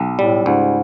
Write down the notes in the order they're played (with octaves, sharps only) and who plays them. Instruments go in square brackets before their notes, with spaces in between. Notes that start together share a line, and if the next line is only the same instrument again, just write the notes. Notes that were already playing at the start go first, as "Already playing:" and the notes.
Already playing: [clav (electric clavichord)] B1
[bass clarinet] A2 [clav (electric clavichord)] G3
[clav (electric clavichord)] C#2 [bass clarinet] G#2